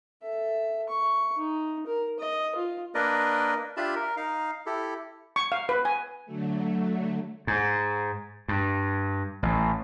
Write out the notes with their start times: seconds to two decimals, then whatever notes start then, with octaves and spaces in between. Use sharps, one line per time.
0.22 A4 E5
0.89 C#6
1.36 D#4
1.87 A#4
2.19 D#5
2.56 F4
2.95 A#3 D4 A#4 B4 D5 D#5
3.77 D4 F4 G4 E5 A5 B5
3.96 A#4
4.17 D#4 F5
4.66 E4 G4 A4
5.36 C#6
5.52 F5
5.69 B4
5.85 G#5
6.26 D3 F#3 A3
7.47 G#2
8.48 G2
9.43 A1